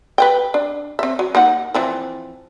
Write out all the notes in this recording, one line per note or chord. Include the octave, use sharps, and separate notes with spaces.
B4 C5 G5
D4
C4 E5
F#3
A#3 D#4 F#5
E3 F3 C4